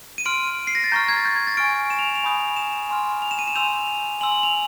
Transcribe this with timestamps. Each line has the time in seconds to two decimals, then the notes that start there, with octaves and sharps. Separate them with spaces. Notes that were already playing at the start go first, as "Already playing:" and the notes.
0.18 D#7
0.26 C6 F6 D7
0.67 C7
0.75 A#6
0.84 A6
0.92 A#5 C#6 F6 G6
1.09 G#6
1.16 A6
1.25 G6
1.36 G#6
1.47 A6
1.57 G#5 C#6 F6 D7
1.90 E7
1.99 F7
2.15 F7
2.23 G#5 B5 D#6 G6
2.56 E7
2.89 G#5 C6 F6
3.22 F7
3.31 E7
3.39 D#7
3.47 E7
3.55 G#5 C6 E6 G6 F7
4.21 G#5 C6 E6 F#7
4.32 F#7
4.43 F7